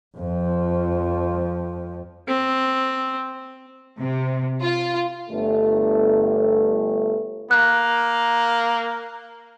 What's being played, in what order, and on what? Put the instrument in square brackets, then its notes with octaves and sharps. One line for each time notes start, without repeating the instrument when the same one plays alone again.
[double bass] F2 F3
[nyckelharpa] C4
[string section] C3
F4
[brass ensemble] G1 A3
[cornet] A#3 [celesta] F#6